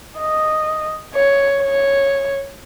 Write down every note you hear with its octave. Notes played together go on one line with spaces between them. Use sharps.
D#5
C#5
C#5